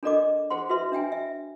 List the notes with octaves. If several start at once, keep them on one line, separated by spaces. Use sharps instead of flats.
D4 A4 A#4 D5 D#5 D6
G#4 C5 F#5 C6
F#4 B4 E5 C6
D4 E5 G5 G#5
E5